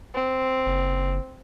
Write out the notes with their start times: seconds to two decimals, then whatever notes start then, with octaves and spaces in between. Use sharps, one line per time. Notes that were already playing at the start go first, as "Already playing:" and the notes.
0.14 C4
0.66 F#1